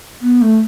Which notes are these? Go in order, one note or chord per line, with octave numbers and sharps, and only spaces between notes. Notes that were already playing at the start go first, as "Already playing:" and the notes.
B3
A3